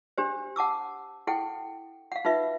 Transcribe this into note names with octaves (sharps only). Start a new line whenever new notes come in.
D4 G4 C5
F#5 A5 D6 E6
E4 A4 F#5 G5
F5 F#5
D#4 F4 B4 E5